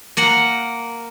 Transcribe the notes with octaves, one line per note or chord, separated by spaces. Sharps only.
A#3 A#4 F#5